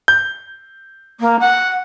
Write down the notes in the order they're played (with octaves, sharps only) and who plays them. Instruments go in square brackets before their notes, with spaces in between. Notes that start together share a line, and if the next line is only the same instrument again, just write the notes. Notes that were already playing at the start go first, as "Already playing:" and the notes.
[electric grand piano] G6
[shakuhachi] A#3
F#5